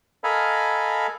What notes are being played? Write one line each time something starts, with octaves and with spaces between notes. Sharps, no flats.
A4 A#4 D#5 F5 G#5 B5